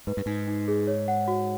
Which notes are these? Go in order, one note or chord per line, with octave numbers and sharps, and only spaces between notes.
G#2 B4
G2
G#2 D#4
D#4
G#4
C#5
F#5
F#4